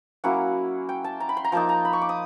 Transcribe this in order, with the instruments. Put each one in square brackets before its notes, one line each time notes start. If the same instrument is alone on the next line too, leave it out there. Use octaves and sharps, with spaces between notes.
[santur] F#3 A#3 C#4 E4 F#5
G5
A5
A#5
B5
C6
A#5
F3 A#3 D#4 A5
A#5
B5
C#6
D6
D#6